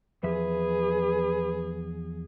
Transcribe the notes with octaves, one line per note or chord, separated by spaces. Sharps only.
E2 F3 G#4 B4 E5